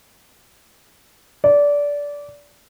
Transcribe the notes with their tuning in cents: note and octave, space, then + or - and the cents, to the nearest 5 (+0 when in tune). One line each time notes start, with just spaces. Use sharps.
D5 -20